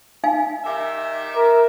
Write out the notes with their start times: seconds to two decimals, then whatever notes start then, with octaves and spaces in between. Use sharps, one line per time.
0.24 D#4 F5 G#5
0.64 D#3 G4 E5
1.36 A#4